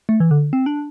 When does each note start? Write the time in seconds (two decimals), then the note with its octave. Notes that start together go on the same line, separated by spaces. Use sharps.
0.09 A3
0.20 E3
0.31 D3
0.53 C4
0.66 D4